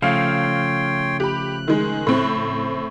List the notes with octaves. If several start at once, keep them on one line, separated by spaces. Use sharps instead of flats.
C#3 F3 A3 C#5 F5 G5 C6
G4 B5 F#6
D#3 G#3
A2 C4